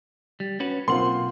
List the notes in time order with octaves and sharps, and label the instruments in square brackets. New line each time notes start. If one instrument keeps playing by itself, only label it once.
[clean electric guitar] G3
C#4 F#4 B4
[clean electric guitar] B1 F#5 [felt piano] A#3 C4 F4 [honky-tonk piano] C6